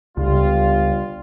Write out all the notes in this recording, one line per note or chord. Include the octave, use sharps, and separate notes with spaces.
G1 C#2 G3 F4